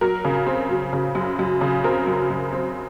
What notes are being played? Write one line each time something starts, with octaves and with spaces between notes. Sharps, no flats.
F#3 A#4
C#3
C4
F#3
C#3
F#2
F#2
C#3
C4 A#4
F#2
F#2
C4